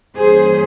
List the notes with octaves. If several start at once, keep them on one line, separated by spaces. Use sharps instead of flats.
G2 E3 G3 A#3 C#4 G#4 C5